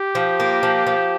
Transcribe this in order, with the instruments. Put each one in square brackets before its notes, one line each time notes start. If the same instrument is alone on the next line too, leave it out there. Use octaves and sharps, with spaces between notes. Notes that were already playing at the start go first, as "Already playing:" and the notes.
Already playing: [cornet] G4
[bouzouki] F3
A#3
F3
F3